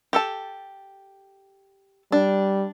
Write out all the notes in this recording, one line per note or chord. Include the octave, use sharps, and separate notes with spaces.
G4 A4 A5
G3 D4